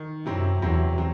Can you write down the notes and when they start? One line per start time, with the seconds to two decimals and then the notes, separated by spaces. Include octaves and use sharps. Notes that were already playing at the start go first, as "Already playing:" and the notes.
Already playing: D#3
0.25 F#2 C3 F#3 C4 E4
0.61 E2 C3 F#3 C4 E4
0.98 F#3 C4